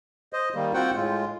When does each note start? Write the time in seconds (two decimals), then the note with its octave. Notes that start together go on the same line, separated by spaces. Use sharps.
0.33 C5 D#5
0.55 D#3 G3 A#3
0.74 C4 F4 F#4 C5 F#5 G5
0.95 A2 G#3 F4